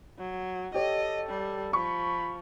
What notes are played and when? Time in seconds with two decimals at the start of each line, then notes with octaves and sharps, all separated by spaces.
0.19 F#3
0.74 G4 A4 C#5 D#5
1.29 G3
1.73 F3 B5 C#6